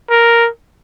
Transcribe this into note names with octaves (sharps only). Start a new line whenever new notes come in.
A#4